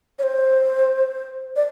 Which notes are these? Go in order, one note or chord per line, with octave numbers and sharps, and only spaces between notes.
C#5
C5
D5